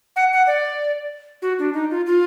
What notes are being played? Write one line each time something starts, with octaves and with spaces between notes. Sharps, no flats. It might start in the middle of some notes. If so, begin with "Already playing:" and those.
F#5
F#5
D5
F#4
D4
D#4
F4
F4